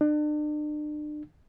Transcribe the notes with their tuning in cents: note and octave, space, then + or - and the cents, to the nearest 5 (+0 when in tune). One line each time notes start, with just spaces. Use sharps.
D4 +40